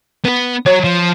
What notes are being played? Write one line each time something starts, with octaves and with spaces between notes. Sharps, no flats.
B3 B4
F#3 C#5
F3